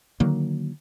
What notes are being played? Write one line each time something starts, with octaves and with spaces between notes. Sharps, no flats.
D3 D#3 F#3 A#3